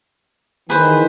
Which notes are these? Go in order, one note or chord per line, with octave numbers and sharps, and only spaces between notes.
D#3 E3 G#4 B4 C5